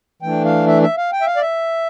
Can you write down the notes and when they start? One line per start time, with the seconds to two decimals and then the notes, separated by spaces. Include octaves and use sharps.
0.22 E3 A3 D4 G5
0.45 F5
0.67 E5
0.82 E5
0.97 F5
1.12 G5
1.21 E5
1.26 F5
1.36 D5
1.42 E5